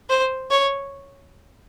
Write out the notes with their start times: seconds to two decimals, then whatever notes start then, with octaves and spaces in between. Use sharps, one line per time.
0.09 C5
0.50 C#5